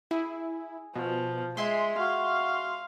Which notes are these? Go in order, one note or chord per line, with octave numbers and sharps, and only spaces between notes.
E4 G#4
B2 F3
G#3 B4 E5 G#5 C6
F#4 F5